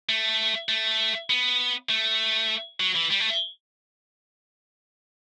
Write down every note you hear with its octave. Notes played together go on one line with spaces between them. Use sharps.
A3
A3
B3
A3
F#3
E3
G3
A3